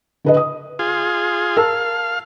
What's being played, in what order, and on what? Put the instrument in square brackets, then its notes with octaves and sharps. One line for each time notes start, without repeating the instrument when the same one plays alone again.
[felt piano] D3 B4 D#5
D#6
[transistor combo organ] F4 G#4
[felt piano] A#4 A5 E6 [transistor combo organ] F5